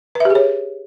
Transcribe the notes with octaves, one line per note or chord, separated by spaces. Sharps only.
G4 G#4 B4 C#5 E5